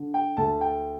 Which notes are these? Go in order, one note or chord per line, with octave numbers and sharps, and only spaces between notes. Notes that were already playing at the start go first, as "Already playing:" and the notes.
Already playing: D3
G5
D2 A5
G5